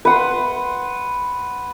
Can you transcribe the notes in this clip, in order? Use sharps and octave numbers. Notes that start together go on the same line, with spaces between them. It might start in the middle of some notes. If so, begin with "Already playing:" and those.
B4 F#5 C6